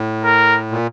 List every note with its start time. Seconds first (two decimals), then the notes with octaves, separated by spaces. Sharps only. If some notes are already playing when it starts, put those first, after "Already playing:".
Already playing: A2
0.24 A#4
0.71 A#2